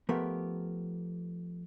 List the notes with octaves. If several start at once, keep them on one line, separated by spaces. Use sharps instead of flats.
F3 A3 B3 G4 A#4